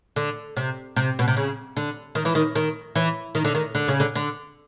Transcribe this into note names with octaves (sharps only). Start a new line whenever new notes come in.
D3
C3
C3
B2
C3
C#3
D3
D#3
E3
D#3
D#3
E3
D#3
D3
D#3
D3
C#3
D3
D3